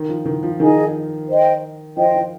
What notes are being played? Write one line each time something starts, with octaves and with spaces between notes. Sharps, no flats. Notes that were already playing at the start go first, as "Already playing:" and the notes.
Already playing: D#3
F3
D#3
F3
D#3 D#4 G#4 D#5 G#5
C5 D#5 G5
F3 C5 D#5 G5
F3